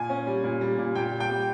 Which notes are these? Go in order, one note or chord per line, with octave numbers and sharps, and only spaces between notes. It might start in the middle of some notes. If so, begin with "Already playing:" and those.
Already playing: A#2 G#5
C#4
G3
A#2
G3
A#2
A#2 G5
G3
G5
G3